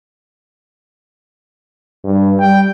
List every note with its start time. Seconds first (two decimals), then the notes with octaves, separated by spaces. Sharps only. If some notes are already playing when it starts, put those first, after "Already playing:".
2.04 G2
2.40 G3 G5